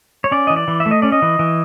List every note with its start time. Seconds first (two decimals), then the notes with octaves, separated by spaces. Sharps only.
0.24 C#5
0.31 C#4 D5
0.47 E3 D#5
0.56 D5
0.68 E3
0.80 E5
0.86 A3
0.91 D#5
1.02 C#4 D5
1.12 D#5
1.22 E3
1.39 E3